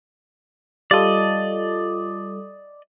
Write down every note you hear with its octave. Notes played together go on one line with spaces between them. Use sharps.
G3 F4 A4 D5 D#5